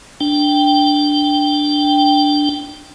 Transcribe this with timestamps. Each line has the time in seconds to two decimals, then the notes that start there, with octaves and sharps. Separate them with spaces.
0.21 D4 G5